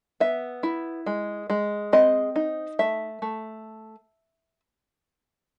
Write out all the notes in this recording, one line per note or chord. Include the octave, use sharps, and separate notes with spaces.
B3 E5
E4
G#3
G#3
C4 D#5
D#4
A3 E5
A3